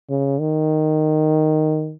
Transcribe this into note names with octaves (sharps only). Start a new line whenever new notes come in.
C#3
D#3